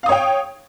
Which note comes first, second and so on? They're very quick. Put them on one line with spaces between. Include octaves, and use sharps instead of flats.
F5 D#6 C#5 G5